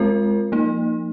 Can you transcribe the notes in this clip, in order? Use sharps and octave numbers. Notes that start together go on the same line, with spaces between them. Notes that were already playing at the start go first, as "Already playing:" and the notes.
Already playing: G#3 C4 F4 A#4
F3 A#3 D#4